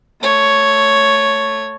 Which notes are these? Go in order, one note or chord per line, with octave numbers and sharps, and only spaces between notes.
A3 C#5